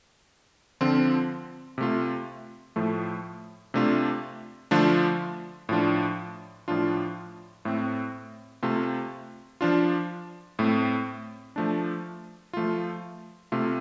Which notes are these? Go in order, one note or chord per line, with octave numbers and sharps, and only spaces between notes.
D3 F3 C4 F4
C3 A3 F4
A2 F3 A3
C3 A3 D4 F4
D3 F3 A3 D4 F4
A2 F3 D4 F4
A2 F3 D4 F4
A2 A3 C4
C3 A3 F4
F3 D4 F4
A2 A3 C4
F3 A3 D4
F3 A3 F4
C3 A3 F4